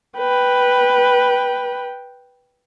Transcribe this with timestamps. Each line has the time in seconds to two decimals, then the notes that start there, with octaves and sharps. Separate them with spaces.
0.17 B4 G5